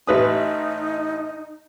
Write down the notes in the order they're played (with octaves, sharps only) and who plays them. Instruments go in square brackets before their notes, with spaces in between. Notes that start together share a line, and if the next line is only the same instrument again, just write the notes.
[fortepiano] A1 B4 D#6 [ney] D#4